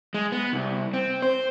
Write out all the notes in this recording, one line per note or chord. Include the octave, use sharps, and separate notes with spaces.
G#3
B3
C2
C4
C5